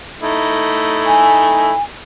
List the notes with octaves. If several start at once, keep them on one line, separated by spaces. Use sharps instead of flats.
A3 D#4 E4
G#5